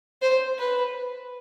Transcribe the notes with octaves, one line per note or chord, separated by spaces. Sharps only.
C5
B4